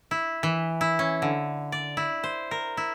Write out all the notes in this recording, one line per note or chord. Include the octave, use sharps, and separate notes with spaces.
E4
E3
E4
C#4
D3
D5
E4
C5
A#4
E4